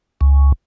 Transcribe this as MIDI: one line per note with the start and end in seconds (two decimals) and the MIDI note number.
0.21 0.52 37